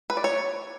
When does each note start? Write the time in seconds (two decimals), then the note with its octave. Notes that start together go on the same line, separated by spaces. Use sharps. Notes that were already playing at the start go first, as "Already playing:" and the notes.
0.10 B4
0.17 D5
0.24 C#5